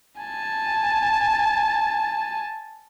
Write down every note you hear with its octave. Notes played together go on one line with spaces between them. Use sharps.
G#5 A5